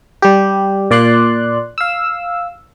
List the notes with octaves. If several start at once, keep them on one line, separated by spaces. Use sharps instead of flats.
G3 G4
A#2 D5 C6 F#6
F5 E6